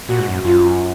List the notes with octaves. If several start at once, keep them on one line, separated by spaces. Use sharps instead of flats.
A#2 F#4
G#2
F#2
F#2 F4